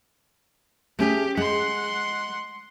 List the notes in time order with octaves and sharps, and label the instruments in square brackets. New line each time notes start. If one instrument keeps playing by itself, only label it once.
[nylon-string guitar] A3 C#4 G#4 [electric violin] G4
[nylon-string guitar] G#3 [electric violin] F#5 C6